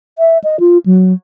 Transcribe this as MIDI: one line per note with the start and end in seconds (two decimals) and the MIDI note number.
0.18 0.38 76
0.44 0.60 75
0.60 0.78 65
0.86 1.13 54